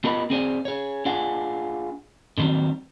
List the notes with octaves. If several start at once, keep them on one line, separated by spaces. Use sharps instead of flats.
B3 F4 G4 A#4 D#5 B5
C4 G#4 C5 D5
G#4 C#5
D4 F4 G#4 F#5
D3 D#3 F#3 G3 C4